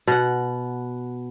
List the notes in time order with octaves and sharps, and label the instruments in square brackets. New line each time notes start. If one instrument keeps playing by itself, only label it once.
[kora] B2 F#5